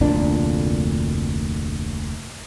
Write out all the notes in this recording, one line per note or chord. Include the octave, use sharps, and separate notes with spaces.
F1 D2 A#2 D4